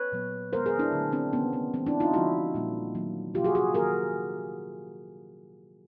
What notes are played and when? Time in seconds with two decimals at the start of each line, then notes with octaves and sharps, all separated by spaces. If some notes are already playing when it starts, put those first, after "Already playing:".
Already playing: B4 C#5
0.12 A#2 F#3 B3
0.53 D#3 G#3 B3 A#4 C5
0.66 G#4 A#4
0.79 D4 E4
0.92 D3 F#3 A3
1.12 C4 D4
1.33 C3 D#3 G3 A#3 B3 C#4
1.53 B3
1.73 E3 G#3 B3 C4
1.86 D4 E4
2.00 D#4 F4
2.13 D3 F3 G#3 E4 F#4
2.54 A#2 G3 A#3
2.95 D#3 F#3 A#3
3.34 C3 F3 A#3 F4 G4
3.44 F#4 G#4
3.55 F#4 G#4
3.74 D#3 F#3 A#3 G#4 A#4